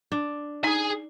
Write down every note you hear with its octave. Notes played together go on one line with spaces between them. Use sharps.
D4
D#4 G#4 G#5